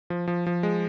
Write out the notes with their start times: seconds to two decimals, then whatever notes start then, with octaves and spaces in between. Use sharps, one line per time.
0.10 F3
0.27 F3
0.47 F3
0.63 G#3